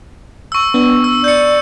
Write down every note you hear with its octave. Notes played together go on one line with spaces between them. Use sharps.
C#6 E6
B3 D4
E6
D5 G6 C#7